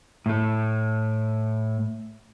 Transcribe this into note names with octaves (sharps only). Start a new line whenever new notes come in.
A2 A3